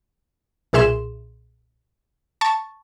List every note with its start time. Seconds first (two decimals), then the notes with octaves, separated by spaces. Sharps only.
0.73 B1 A#2 G#4 E5 C6 E7
2.41 A5 C#6 A6